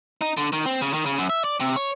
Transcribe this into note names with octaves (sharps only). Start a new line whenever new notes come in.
D#4
D3
D#3
C4
C#3
D#3
C#3
F#2
E5
D5
C3
C#5